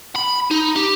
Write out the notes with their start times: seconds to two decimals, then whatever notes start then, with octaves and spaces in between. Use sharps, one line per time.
0.15 B5
0.51 D#4
0.76 G4